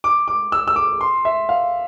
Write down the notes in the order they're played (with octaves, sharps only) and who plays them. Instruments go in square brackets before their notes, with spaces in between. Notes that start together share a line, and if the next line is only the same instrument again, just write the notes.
[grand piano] D6
D6
E6
E6
D6
C6
E5
F5